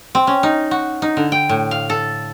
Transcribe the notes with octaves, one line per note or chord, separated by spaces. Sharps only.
C4
C#4
D#4
F#4
D#4
D3
G5
A2
F5
A4